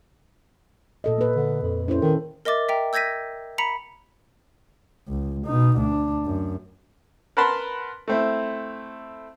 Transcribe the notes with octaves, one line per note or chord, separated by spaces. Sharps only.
A#2 A4 D#5
A#3 B4
D3
F2
C#4 E4 C5
D#3 A4
A#4 D#5 E5 D6 A6
E5 G5 A#5
E6 G6 G#6 A#6 B6 D#7
A#5 B5 B6 C#7
C#2
B2 D#4
D2 D4
F#2
A#4 B4 F#5 A5 B5 C6
A3 C4 E4